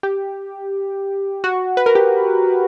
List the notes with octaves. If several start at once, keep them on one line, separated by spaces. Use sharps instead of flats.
G4
F#4
B4
A#4
G4